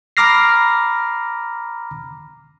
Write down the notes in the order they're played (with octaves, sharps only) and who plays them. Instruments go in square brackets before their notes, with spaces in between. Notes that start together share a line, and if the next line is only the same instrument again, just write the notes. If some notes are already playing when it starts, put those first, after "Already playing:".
[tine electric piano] A#5 B5 D6 F6 A#6 C7